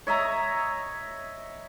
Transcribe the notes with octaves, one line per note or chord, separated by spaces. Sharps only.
C#5 D#5 E5 A#5